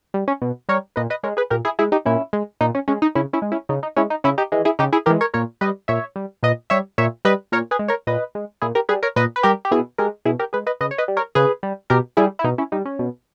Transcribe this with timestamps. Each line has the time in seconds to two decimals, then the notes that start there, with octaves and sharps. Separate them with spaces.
0.14 G3
0.28 C#4
0.42 B2
0.69 G3 A#4 C#5
0.96 A#2 B4 D#5
1.10 B4 D#5
1.23 G#3 A#4 C#5
1.37 G#4 B4
1.50 A#2 G4 A#4
1.65 E4 G#4
1.79 G#3 E4 G#4
1.92 D#4 G4
2.05 A#2 C#4 E4
2.33 G#3
2.61 A#2 D#4
2.75 C#4
2.88 G#3 C#4
3.02 D#4
3.15 C#3 C#4 E4
3.33 C#4 E4
3.42 G#3
3.52 C#4 E4
3.69 C#3 D#4
3.83 D#4
3.97 G#3 C#4 E4
4.10 D#4
4.24 C#3 C#4 E4
4.38 D#4 G4
4.52 E3 G#3
4.65 E4 G#4
4.79 C#3 D#4 G4
4.93 E4 G#4
5.06 E3 G#3 G4 A#4
5.21 A#4 C#5
5.34 A#2 A#4 C#5
5.61 G3 B4 D#5
5.88 A#2 C#5 E5
6.16 G3
6.43 A#2 B4 D#5
6.70 G3 C#5 E5
6.98 A#2 C#5 E5
7.25 G3 B4 D#5
7.52 A#2 A#4 C#5
7.71 G#4 B4
7.79 G#3
7.88 A#4 C#5
8.07 A#2 B4 D#5
8.35 G#3
8.62 A#2 E4 G#4
8.75 G4 A#4
8.89 G3 G#4 B4
9.03 A#4 C#5
9.16 A#2 B4 D#5
9.36 B4
9.43 G3 G4 A#4
9.65 G4
9.71 B2 E4 G#4
9.98 G#3 G4 A#4
10.25 B2 E4 G#4
10.39 G4 A#4
10.53 G#3 G#4 B4
10.67 B4 D#5
10.81 C#3 B4 D#5
10.91 C#5
10.98 B4 D#5
11.08 G3
11.17 A#4 C#5
11.35 C#3 G#4 B4
11.63 G3
11.90 B2 G4 A#4
12.17 G3 E4 G#4
12.39 E4
12.44 B2 D#4
12.58 C#4 E4
12.72 G3 D#4
12.85 C#4
12.99 B2